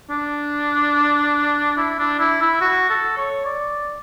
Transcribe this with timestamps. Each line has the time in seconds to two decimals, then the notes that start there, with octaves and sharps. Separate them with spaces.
0.10 D4
1.77 E4
1.99 D4
2.20 E4
2.42 E4
2.61 F#4
2.90 A4
3.18 C#5
3.46 D5